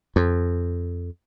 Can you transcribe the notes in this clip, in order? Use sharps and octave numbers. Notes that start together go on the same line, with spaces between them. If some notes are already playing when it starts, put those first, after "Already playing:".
F2